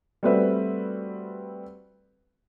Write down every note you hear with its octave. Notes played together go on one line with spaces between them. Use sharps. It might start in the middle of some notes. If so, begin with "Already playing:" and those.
G3 A3 C4 F#4 B4 E5